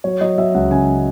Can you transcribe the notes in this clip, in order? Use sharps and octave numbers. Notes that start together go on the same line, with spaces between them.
F#3 C#5
F#3 D#5
F#3 E5
C#2 F#5
C#3 G#5